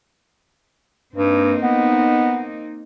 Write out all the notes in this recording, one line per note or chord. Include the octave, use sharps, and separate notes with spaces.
G2 A#3 C4 D#4
B3